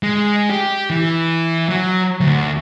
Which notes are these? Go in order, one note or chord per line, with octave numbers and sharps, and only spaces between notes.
G#3
G4
E3
F#3
D2